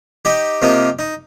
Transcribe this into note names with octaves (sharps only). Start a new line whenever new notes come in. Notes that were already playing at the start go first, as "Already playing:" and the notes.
D#4 G4
C3 F3 A#3 D#4
D#4